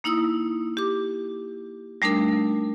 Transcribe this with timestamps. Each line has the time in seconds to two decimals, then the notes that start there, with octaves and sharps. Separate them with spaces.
0.04 A#3 D#4 E4 D#6 E6
0.77 G4 D6
2.02 G3 A3 D4 D#4 A#4